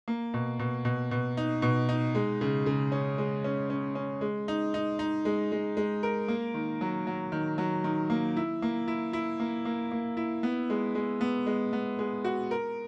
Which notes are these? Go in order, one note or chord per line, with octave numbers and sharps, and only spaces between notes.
A#3
B2
B2
B2
B2
D#4
B2
D#4
G#3
C#3
C#3
C#4
G#3
C#4
C#4
C#4
G#3
D#4
D#4
D#4
G#3
G#3
G#3
A#4
A#3
D#3
F#3
F#3
D#3
F#3
D#3
A#3
E4
A#3
E4
E4
A#3
A#3
A#3
E4
B3
G#3
G#3
B3
G#3
B3
G#3
F#4
A#4